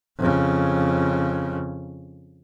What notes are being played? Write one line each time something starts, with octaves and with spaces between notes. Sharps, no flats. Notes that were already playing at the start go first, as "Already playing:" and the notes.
F2 C#3